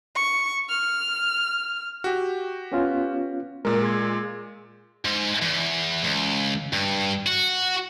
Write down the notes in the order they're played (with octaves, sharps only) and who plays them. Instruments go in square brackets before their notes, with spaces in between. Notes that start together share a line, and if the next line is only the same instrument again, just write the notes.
[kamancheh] C#6
F6
[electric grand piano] F#4 G4
[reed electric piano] B3 C#4 F4
[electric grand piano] A#2 G#3 [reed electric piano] A#4
[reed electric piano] G#4 C6 G#6
[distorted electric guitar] G#2
E2
C#2
G2
F#4